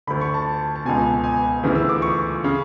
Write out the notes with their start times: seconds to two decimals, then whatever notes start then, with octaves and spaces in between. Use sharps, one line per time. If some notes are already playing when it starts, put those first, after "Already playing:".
0.07 D2 D3 B5
0.21 C#6
0.34 A5
0.76 A5
0.85 C#2 B2 G#5
1.24 G#5
1.63 D2 C#3 E3
1.75 E6
1.89 D6
2.02 C#6
2.44 C#3